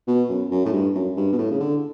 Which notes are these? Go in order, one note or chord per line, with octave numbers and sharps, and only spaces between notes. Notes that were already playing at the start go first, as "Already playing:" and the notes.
B2
F#2
F#2
A2
G2
F#2
G2
B2
A2
C#3
D3